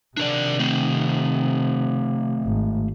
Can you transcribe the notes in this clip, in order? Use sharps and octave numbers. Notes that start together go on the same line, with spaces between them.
C3 D#3 D4 A#4 D5
A3 C4
G#1